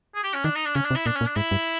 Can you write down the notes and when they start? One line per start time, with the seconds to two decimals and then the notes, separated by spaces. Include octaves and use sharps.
0.15 G#4
0.24 G4
0.34 C#4
0.44 D#3 D4
0.55 D#4
0.65 D4
0.75 C#3 C#4
0.85 D4
0.91 C3
0.95 E4
1.06 A#2 D4
1.16 C#4
1.21 A#2
1.27 D4
1.36 G#2 E4
1.51 G2